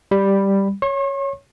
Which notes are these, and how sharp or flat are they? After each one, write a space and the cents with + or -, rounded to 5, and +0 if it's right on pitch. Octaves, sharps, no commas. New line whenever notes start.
G3 +0 B5 +0
C#5 +0 C#6 -45